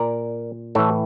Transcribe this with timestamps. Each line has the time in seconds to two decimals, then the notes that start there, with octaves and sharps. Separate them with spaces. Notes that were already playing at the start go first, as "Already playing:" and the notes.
Already playing: A#2 A#4 D5
0.75 A2 E3 A4 C#5